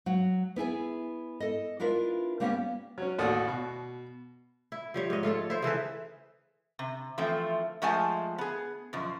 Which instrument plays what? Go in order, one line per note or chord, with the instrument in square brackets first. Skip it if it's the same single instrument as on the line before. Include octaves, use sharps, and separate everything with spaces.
[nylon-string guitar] F#3 F#4
B3 E4 G#4 G#5
A4 D#5
D4 E4 F4 A#4 B4
G3 A#3 B3 C#4 D4 G4
[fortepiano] F#3 C#4
A1 D#2 F#4 A4 D5 D#6
B2
[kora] E4
F3 G3 C#5
G#2 D#5
A3 F4 A4 C#5
E4 C5
C#3 E3 A4 B4
[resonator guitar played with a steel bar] C3
E3 F3 A3 C4
F3 G#3 A3 F#5 G#5 A5
B3 G#4
F#2 B2 F3